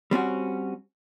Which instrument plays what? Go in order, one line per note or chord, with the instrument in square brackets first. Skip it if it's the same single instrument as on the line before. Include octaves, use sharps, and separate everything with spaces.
[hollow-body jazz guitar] G3 C4 C#4 F#4